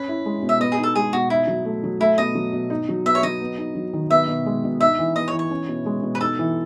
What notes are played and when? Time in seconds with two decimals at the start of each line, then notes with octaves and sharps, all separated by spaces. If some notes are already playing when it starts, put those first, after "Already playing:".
Already playing: C#4 B4
0.08 E4
0.26 G#3
0.43 B2
0.49 E5
0.60 B3 D#5
0.72 G#4
0.78 D#4
0.83 A4
0.95 G#3 G#4
1.13 B2 F#4
1.30 D#4 E4
1.47 F#3
1.65 A3
1.84 F#3
2.00 A3 E4
2.18 B2 D#5
2.35 F#3
2.53 B2
2.70 D#4
2.89 F#3
3.05 B3 E5
3.15 C#5
3.23 F#3 D#5
3.41 B3
3.58 D#4
3.75 F#3
3.93 D#3
4.10 B3 E5
4.28 B2
4.46 G#3
4.64 B2
4.80 D#4 E5
4.99 E3
5.16 B3 D#5
5.28 C#5
5.33 E3
5.39 C#5
5.51 C#4
5.68 B2
5.86 G#3
6.03 B2
6.15 B4
6.21 D#4 A4
6.39 E3